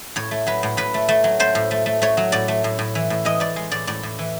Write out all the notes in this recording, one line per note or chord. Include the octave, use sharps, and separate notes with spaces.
A2 C#5
A3
F#3 B4
A2
A2 B4
A3
A3
F#3
A3 C5
A2
A3
A3
A3 C#5
F#3
A2 D5
A3
A2
A2
E3
A2
E3 D#5
A2 D5
G#3
A2 D5
A2 D5
A2
E3